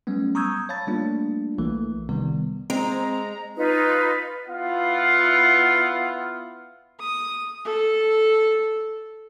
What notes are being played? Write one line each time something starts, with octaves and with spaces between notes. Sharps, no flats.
F#3 G3 A3 B3 C#4
A#5 C#6 D#6 E6 G6 G#6
C#5 F5 A5 B5 A6
G3 A3 A#3 D4 F4
B1 E3 A3 A#3
C3 D#3 G3 B3
G#3 C4 A#5
D#4 F4 B4
B3 E4 F4 F5 F#5
D#6
A4